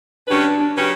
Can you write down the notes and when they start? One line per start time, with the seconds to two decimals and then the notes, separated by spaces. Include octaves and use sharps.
0.28 C#3 F#3 C#4 D4 G4 B4
0.75 C#3 F#3 C#4 G4 B4